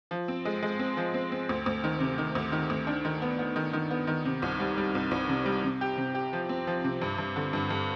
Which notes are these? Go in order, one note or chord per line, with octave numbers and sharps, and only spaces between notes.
F3
C4
G#3
G#3
C4
F3
C4
C4
D2
D2
D#3
C3
D#3
D2
D#3
D2
D4
D#3
B3
B3
D#3
D#3
B3
D#3
C3
C2
G3
G3
C2
C2
C3
G3
C3
G4
C3
G4
F3
C4
F3
C3
G2
G2
D3
G2
G2